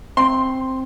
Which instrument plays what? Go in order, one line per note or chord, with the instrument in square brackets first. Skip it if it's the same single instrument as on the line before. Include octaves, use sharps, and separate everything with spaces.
[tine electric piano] C4 [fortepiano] C6